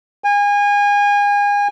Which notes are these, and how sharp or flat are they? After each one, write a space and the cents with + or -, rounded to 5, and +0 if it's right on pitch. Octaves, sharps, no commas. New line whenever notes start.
G#5 -30